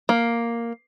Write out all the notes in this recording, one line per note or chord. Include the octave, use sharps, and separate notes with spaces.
A#3